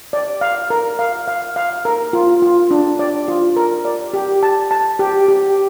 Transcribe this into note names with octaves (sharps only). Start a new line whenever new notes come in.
D5
F5
A#4
F5
F5
F5
A#4
F4
F4
D4
D5
F4
A#4
D5
G4
A5
A5
G4
G4